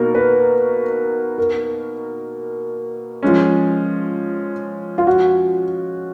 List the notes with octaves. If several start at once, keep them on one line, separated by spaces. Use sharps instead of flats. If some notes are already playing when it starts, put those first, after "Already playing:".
Already playing: B2 A#3 D#4 F#4 A#4
B4
A#4
F3 G#3 C#4
F4
F#4